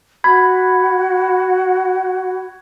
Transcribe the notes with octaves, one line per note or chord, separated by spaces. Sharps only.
F#4 B5 G#6